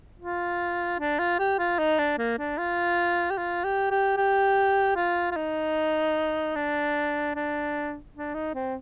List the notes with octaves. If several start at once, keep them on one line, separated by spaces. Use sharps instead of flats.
F4
D4
F4
G4
F4
D#4
D4
A#3
D4
F4
G4
F4
G4
G4
G4
F4
F4
D#4
D4
D4
D4
D#4
C4